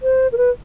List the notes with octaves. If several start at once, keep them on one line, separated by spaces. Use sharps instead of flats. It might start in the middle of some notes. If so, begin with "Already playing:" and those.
C5
A#4
B4